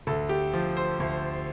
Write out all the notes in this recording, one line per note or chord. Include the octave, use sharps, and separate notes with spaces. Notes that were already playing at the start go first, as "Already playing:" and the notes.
D2 A4
G4
F3
C5
D2